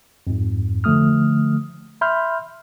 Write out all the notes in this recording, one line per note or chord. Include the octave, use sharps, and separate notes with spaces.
F2 G#2
D3 F3 A3 D#6 F6
E5 B5 C6 F6 G6